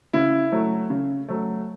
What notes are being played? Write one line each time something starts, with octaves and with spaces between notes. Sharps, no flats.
C#3 E4
F#3 A3
C#3
F#3 A3